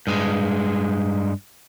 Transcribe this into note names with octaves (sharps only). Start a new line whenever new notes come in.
G2 G#3